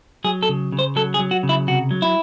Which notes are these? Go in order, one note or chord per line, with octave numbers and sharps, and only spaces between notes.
F#3 G#4
A4
C#3
C#3
C5
F#3 A4
G#4
F#3
F#4
C#3
E4
C3 F#4
F#3
E4